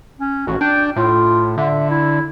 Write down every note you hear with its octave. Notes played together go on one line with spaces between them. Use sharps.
C#4
A1 F#4
D4 G5
A2 F4
D3 E5
E4